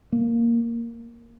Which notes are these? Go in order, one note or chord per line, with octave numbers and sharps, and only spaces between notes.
A#3